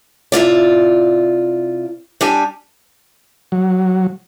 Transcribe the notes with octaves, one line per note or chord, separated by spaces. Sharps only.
C3 E4 F4 D5
G3 D4 G4 G#5
F#3